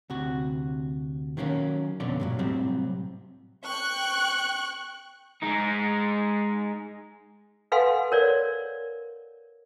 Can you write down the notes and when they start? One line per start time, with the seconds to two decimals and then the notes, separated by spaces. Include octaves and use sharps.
0.10 D2 C3 F#4
1.37 D#3 F#3 A#3 B3 C#4
2.00 F2 B2 D3 C#4 D5
2.20 G2 A#2 F#3
2.39 A2 C3 F#3 G3 C4
3.65 G5 C#6 F#6
5.43 G#3 D#4
7.72 A4 B4 F5 F#5 G#5 C6
8.12 A#4 C#5 D5